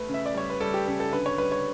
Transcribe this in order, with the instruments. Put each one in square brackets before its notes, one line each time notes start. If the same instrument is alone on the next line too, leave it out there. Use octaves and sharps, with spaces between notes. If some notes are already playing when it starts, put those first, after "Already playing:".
Already playing: [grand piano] A3 B4
C#3
E5
D5
G3 C#5
B4
G3 A4
G4
C#3 A4
A4
D3 B4
C#5
G3 B4
C#5